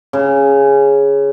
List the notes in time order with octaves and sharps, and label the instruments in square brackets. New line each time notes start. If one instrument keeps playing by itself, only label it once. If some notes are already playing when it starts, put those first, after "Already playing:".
[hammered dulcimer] C#3